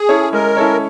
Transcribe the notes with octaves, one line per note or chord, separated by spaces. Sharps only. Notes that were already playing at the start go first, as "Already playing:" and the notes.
Already playing: G#4
C#4 E4 A4 C#5
G#3 A#4
C#4 E4 A4 C#5